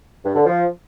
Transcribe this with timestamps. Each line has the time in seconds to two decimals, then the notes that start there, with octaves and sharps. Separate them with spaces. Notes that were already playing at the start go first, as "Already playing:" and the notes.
0.25 G2
0.35 D3
0.45 F3